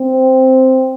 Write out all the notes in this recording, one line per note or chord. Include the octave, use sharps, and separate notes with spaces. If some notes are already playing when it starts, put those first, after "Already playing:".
Already playing: C4